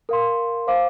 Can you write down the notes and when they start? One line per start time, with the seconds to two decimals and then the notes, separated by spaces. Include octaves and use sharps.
0.09 A#4 F5 C6
0.67 C5 F5 D6